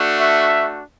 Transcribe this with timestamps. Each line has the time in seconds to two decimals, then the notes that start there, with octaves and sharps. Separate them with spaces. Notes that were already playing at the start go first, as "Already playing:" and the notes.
Already playing: A3 D4 F#4
0.17 E5